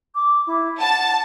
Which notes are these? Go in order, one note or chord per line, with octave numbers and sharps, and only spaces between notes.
D6
E4
F#5 A5